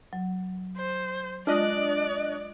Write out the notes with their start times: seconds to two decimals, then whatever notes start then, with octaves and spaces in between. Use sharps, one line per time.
0.13 F#3
0.78 C5
1.47 G#3 D4 F4 D5 D#5 F#6